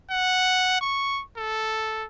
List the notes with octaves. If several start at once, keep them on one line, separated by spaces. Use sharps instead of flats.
F#5
C#6
A4